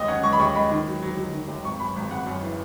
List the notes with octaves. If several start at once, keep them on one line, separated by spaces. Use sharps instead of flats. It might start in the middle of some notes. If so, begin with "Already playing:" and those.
Already playing: D#2 G#3 C#5 D#5
C#4 F#5
G#3 C#6
B5
D#2 C#6
G#3 B5
D#3
F#3
F#3
F#3
D#3
D#2
G#1 C#6
F#2 B5
G#1
G#1 F#5
F#2
E3